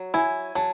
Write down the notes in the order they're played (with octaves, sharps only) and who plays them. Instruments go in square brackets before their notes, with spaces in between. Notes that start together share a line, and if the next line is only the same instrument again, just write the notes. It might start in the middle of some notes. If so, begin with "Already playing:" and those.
Already playing: [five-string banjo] F#3
[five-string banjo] E4 [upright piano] G#5
[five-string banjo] F#3 [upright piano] A5